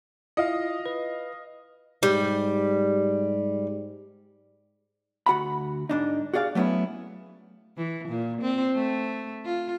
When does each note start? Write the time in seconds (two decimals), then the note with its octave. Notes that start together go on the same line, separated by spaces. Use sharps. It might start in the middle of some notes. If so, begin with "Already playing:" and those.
0.37 E4 F4 D#5 F5
0.86 B4
2.03 G#2 G3
5.26 D2 F#4 F#5 B5
5.89 G#2 D4 D#4
6.34 F#4 G#4 D5 F5
6.55 F#3 A3 B3 C#4 E4
7.78 E3
8.09 A#2
8.42 C4
8.75 A3
9.46 F4